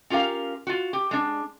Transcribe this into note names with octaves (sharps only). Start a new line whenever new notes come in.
C#4 F4 G4 A#4 F5
F4 F#4
G4
G#3 D4